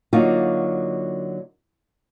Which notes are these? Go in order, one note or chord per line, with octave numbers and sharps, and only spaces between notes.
D3 F#3 A#3 D#4 F4 F#4